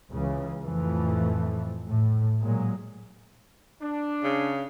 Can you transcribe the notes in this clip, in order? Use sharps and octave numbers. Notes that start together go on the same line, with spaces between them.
C#2 C#3 E3
F2 A2 E3 F3 A3
A2
A#2 F#3 G#3
D4
C#3